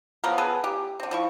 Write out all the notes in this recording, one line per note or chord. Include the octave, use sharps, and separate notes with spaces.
F3 F#3 B3 A#4
B3 G#4 A4 B4
G4
D3 C4
F3 E4 C#6